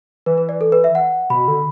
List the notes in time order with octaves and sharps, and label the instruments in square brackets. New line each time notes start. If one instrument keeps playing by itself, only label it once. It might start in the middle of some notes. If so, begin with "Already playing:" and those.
[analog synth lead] E3 [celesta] B4
[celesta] B4
D5
A4
B4
E5
F#5
[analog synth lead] B2 [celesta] B5
[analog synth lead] D3